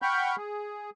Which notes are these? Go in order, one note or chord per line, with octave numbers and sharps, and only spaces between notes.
F#5 G5 B5 C#6 F6 G6
G#4